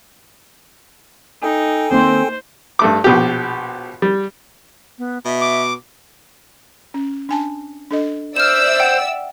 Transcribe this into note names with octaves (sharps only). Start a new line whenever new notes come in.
D#4 A4 G5 G#5
D#3 A#3 C4 D#4 C5
G2 A3 D6
A#1 B2 G4
G3
B3
B2 E5
D6
C#4
D4 G#5 A5
D4 A4 D#5
C5 D5 E5 E6 F6 E7
F#5 G5